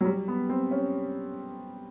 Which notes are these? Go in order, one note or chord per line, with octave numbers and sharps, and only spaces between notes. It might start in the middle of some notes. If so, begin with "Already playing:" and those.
F#3
G3
B3
C4
C#4